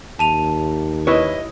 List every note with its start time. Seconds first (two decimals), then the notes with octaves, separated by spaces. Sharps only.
0.19 D#2 A5 D#7 F7
1.07 E4 B4 C#5 D#5